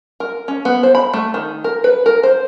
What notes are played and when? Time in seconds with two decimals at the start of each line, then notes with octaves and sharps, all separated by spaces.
0.20 A#4
0.48 C#4
0.65 B3
0.83 C5
0.95 B5
1.13 A3
1.34 D#3
1.64 A#4
1.84 B4
2.06 A#4
2.23 C5